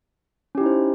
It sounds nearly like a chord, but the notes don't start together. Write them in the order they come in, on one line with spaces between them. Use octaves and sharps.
C#4 G4 E4 D#4 C5